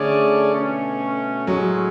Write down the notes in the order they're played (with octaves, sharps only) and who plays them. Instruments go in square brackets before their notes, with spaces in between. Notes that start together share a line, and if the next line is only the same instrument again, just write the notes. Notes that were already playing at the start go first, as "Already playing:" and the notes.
Already playing: [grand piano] D3 [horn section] A3 C#4 G#4 D5
[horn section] B2 A3 C#4
[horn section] A2 G#3 C#4 [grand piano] F#3